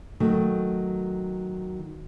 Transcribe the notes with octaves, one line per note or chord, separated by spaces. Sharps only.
D#3 F#3 A3